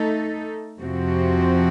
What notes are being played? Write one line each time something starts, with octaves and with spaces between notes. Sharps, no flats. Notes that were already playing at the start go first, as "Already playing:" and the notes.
Already playing: A3 D#4 A4
F2 C3 F3 C4 F#4